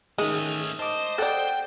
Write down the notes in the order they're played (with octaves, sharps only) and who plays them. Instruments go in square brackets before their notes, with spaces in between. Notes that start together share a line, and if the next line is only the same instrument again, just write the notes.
[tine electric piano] D#3 D#6 [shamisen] G#3 [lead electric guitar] A3 C#4
[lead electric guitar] C5 [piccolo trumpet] D#5 [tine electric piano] A5 D6
[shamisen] A4 D5 [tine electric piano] F#5 [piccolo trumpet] G5